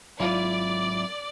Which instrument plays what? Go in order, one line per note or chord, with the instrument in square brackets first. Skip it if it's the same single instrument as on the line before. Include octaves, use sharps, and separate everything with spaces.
[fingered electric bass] G#1 F#3 [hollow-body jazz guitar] E4 F4 [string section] D5